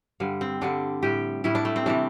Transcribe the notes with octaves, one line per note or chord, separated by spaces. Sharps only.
G2 D3 G3
C4
G2 D3 G3 D4
A2 G3 G4
A2 G3 E4
D4
A3
C4
C3 E3 G3 D4